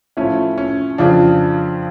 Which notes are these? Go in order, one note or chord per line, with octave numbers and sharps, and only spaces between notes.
A2 F3 A3 C#4 E4
C#4
F2 C#3 F3 D4